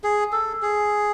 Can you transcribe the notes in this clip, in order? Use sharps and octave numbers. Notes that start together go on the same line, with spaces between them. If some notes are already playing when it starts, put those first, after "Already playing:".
G#4
A4
G#4